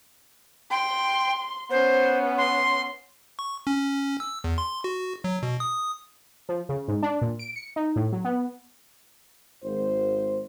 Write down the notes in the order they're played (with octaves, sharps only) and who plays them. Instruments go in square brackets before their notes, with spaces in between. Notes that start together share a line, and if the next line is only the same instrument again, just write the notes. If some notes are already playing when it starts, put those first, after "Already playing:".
[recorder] G5 [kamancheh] C6
[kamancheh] B3 C#4 [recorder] C5
[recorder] C6
[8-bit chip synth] C#6
C#4
E6
E2
C6
F#4
F#3
B2
D#6
[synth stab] F3
C#3
G#2
D4
A#2
D7
C#7
D#4
A2
F#3
B3
[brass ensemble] G#1 C5